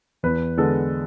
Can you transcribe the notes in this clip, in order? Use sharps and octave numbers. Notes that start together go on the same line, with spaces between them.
E2 B4
D3 G#3 B3 A4